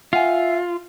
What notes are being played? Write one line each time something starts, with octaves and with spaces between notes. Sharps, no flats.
F4 E5 F#5 G#5